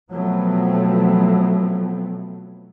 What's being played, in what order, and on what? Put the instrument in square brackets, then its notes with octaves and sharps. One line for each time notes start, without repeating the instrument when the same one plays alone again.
[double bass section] B2 F3 F#3 A3 B3 C4